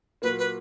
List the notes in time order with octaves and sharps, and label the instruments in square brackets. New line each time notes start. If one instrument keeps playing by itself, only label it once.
[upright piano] A#2 F#3 A#3 [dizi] B4
[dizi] B4